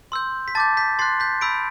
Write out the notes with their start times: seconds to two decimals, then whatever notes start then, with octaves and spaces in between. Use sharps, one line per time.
0.12 C6 E6 G6
0.48 B6
0.55 A5 D6 G6 A6
0.77 G6 B6
0.99 C6 F#6 A6 C7
1.20 G6 B6
1.41 B5 E6 G6 B6 D7